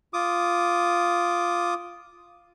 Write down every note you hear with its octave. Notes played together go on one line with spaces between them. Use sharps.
F4 D6 D#6